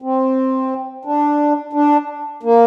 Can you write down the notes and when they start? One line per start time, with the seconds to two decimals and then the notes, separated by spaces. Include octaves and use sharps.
0.02 C4
1.05 D4
1.73 D4
2.43 A#3